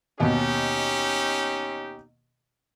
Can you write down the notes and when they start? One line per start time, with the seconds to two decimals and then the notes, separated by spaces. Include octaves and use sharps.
0.20 D#2 B2 C#4 D#4 G4